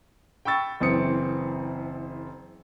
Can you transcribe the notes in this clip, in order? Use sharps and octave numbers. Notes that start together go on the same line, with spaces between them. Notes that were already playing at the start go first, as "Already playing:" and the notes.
G5 B5 C#6 E6 A6
F#1 E3 C4 D#6 C#7